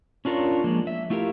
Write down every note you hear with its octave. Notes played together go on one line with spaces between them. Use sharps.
C#4 D4 F4 A#4 C#5
F3 G#3 A#3
E5
A3 E4 F4 G4 A4 A#4